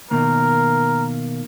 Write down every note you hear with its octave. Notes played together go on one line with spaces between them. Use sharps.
B2 D#3 A#3 A#4